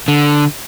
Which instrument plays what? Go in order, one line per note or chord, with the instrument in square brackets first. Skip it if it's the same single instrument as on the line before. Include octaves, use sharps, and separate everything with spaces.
[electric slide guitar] D3